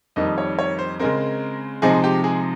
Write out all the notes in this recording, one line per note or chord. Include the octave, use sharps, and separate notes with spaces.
F2 D#3 G3 A#3 D#5
C#5
C#5
C5
C#3 G#3 C4 A#4
C3 F3 G#3 C4 D#4 G#4
G4
G#4